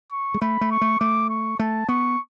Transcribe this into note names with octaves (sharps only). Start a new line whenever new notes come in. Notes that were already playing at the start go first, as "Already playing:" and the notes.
C#6
G#3
A3 B5
A3
C#6
A3
A3 D6
C#6
A3 A5
B3 C#6